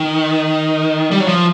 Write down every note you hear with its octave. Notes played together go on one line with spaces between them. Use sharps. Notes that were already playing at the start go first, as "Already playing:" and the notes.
Already playing: D#3
G3
F#3
F3